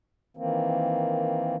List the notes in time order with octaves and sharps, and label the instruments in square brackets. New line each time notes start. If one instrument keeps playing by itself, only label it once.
[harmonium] D#3 E3 A#3 C4